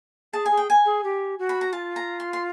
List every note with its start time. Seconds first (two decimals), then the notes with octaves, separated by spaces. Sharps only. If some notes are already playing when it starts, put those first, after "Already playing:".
0.33 G#4 A5
0.46 G#5
0.51 G#4
0.57 G5
0.70 G#5
0.85 G#4
1.04 G4
1.39 F#4
1.49 B5
1.61 A#5
1.73 F4 A5
1.96 A#5
2.20 C6
2.33 C6